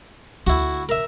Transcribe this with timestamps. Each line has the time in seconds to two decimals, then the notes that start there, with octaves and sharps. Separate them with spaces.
0.47 D2 E4 F#4
0.89 A#4 E5